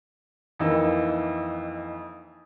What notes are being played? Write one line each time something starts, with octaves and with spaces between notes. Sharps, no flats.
F2 E3 A#3 D#4 E6